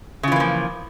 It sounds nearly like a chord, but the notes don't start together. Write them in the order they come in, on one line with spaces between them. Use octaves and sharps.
C#3 F4 E3 A#3 F3